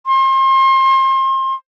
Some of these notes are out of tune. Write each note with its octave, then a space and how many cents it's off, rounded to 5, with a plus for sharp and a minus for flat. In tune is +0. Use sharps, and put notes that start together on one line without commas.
C6 +35